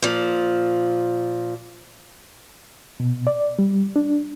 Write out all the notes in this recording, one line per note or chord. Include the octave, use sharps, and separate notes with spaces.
A#2 F3
B2
D5
G3
D4